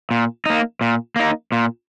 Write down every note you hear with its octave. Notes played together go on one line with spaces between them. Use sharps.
A#2
A#3 D#4
A#2
A#3 D#4
A#2